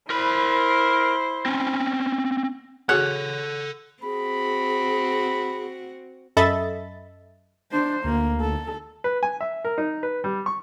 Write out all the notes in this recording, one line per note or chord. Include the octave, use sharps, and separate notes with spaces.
E4 A#4 C5 B5
C4 C#4
F#4 G#4 A4 C#5 F#5 G#5 F#6
C4 F#4 G#4 B5
F#2 A4 D#5 E5 B5 A6
D4 C5
D2 A#3
A4
B4
G#5
E5
A#4
D#4
B4
G3
C#6